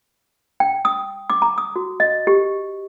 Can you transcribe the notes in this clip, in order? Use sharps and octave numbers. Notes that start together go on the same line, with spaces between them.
G5
D#6
D6
A#5
D#6
F#4
D#5
G4